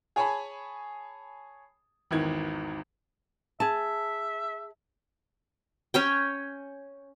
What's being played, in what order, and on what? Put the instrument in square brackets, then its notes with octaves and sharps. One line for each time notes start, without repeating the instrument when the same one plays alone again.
[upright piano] G#4 C#5 G#5 A5 B5
G#1 E2 D#3 G#6
[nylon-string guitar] G#4 A5 [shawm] E5
[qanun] C#4 C#5 G5